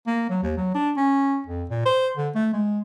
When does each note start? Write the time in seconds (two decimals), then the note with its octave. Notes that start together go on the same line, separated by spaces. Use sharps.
0.07 A#3
0.29 F#3
0.42 D#2
0.57 F#3
0.74 D4
0.97 C#4
1.46 F2
1.70 A#2
1.85 C5
2.17 D3
2.35 A3
2.53 G#3